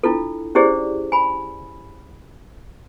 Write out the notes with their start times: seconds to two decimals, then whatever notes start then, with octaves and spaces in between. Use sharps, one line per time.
0.03 D4 E4 F4 A4
0.55 C#4 E4 G4 G#4 C5 D5
1.12 G#5 B5